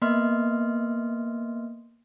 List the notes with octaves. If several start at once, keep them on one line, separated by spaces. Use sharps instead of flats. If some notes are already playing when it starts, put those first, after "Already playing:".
A#3 B3 D#5 E5 C6 F6